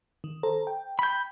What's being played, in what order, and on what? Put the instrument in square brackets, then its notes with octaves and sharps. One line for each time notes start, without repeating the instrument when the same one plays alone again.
[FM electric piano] D#3
A4 C5 A#5
G5
[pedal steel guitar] B5 G6